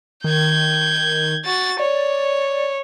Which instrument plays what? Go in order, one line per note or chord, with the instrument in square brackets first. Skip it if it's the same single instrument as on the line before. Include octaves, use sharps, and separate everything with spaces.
[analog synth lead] D#3 [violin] G6 G#6
[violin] F#4 A6
[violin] C#5 [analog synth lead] D5